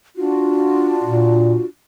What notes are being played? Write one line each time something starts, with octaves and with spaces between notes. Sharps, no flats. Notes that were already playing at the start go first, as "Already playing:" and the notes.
D4 F4 F#4
A#2